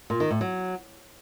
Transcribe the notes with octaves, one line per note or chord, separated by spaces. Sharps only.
A#2
D#3
A2
F#3